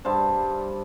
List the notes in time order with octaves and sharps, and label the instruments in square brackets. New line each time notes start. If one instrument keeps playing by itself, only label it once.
[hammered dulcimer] G2 G3 C5 A5